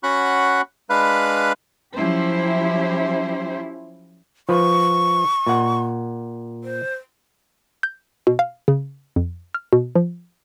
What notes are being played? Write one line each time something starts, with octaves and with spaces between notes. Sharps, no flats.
C#4 F#4 F#5 B5 C#6 F#6
G#3 D4 B4 F5 B5 F#6
F3 F#3 C#4 E4 G4 C5
F3 B4 C#6
A#2 F#5
C5
G6
B2
F5
C#3
F2
F6
B2
F3